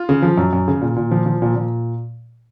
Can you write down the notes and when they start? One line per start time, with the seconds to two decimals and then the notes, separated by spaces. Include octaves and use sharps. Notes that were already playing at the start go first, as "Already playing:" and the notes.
Already playing: F4
0.09 C#3
0.22 F3
0.38 F#2
0.53 F#2
0.68 C#3
0.82 A#2
0.96 A#2
1.11 F3
1.26 F3
1.42 A#2
1.56 A#2